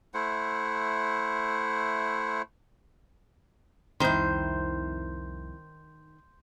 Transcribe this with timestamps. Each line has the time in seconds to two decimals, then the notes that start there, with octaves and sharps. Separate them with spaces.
0.14 A3 E4 C5 F#5
4.00 C2 F2 D#3 C4 E4 C5 C6 G6